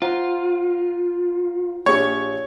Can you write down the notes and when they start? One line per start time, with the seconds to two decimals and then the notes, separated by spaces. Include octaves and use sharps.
0.02 F4 C5 F#5 A#5
1.86 A#1 G4 C#5 C#7